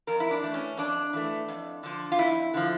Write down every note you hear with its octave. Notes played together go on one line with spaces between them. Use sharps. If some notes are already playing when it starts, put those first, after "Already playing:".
F2 A#4
E4
D4
E3 A3
C#4
F2 D4
E3 A3
F2
D3 F3
F4
F2 E4
D3 F3